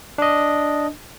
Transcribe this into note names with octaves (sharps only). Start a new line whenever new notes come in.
D4 D#5